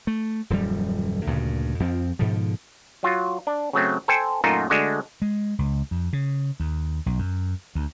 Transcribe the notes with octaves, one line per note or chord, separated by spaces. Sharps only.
A3
D#1 F#2 F3 G3
D2 G2 A#2 C#3
F2 F3 C4
G#2 B2 D3 F3
F#3 F4 F#4
D4
C#3 F#3 A3 C4
A4 C5 G5 G#5
F#2 A#2 A3 D#4 F4 F#4
D3 G#3 A3 D4 F#4
G#3
C#2
F2
C#3
D#2
B1
F#2
D2